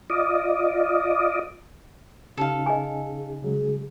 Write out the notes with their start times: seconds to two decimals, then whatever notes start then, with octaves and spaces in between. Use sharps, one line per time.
0.10 F4 D5 D#5
2.37 C#3 C#4 D#4 G4 A4 F5
2.66 G#4 D#5 G#5
3.43 C#3 F#3 G#3 G#4